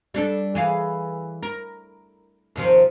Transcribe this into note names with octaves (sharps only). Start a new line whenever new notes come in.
G3 D4 A4
E3 G#4 F5
A#4
D#2 C3 F3